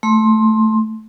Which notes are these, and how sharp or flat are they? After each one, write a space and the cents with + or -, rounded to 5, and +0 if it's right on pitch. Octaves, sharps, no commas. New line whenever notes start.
A3 +0 C6 +15